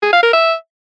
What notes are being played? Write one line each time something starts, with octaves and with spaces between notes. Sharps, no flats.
G#4
F5
A#4
E5